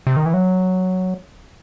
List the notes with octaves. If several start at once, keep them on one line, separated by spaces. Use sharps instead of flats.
C3
D#3
E3
F#3